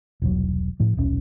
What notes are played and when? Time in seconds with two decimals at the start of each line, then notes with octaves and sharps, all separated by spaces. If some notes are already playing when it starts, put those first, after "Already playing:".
0.22 E1 C2 F#3
0.80 A2 F3
0.97 D#1 B1 C#4